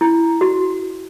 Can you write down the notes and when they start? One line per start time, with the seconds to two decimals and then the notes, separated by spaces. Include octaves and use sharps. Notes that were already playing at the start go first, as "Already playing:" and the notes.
0.01 E4
0.41 F#4